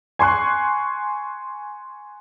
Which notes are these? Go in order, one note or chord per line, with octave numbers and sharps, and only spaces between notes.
G#5 C6 C#6 F#6